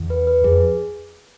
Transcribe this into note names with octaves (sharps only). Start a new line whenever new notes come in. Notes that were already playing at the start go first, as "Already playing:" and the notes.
Already playing: E2
B4
B4
F2 G#4